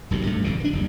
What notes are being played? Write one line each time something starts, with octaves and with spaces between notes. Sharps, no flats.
D#1 B1 A2 C3
G2 A3
G1 F2 A#2 C#3
E3 D4
F#1 D#2 G3